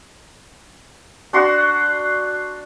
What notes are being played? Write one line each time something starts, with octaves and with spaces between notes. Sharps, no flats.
D4 F#4 C6